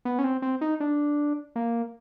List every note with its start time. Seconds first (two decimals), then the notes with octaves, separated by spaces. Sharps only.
0.05 B3
0.19 C#4
0.24 C4
0.42 C4
0.61 D#4
0.80 D4
1.56 A#3